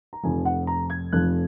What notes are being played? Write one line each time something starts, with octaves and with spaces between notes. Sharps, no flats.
A#5
F1 F2 F3 G#5
F#5
A#5
G#6
F1 F2 F3 F#6